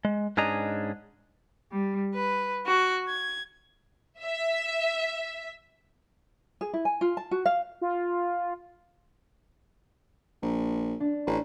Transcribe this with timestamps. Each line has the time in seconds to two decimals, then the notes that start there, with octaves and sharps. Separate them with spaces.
0.05 G#3
0.37 G#2 C#4 D4 G#4 D#5 A#5
1.73 G3
2.14 B4
2.66 F#4
3.08 G#6
4.21 E5
6.61 G#4
6.73 E4
6.85 G#5
7.01 F4
7.17 A5
7.31 F#4
7.46 F5
7.81 F4
10.43 A#1
11.00 D4
11.27 A1